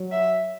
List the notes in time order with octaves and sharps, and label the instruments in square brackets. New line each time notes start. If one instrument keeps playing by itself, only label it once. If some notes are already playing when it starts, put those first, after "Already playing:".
Already playing: [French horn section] F#3
[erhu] E5